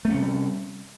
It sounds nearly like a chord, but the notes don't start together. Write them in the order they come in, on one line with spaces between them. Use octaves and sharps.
A3 C#4 C3 G3